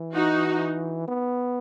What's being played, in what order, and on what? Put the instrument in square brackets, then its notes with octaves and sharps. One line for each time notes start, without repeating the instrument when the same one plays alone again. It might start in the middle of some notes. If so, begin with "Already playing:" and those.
Already playing: [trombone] E3
[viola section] D#4 F#4
[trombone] B3